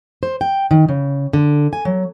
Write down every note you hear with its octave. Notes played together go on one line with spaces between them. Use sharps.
C5
G5
D#3
C#3
D3
G#5
F#3